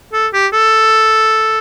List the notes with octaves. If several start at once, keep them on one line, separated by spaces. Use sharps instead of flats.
A4
G4
A4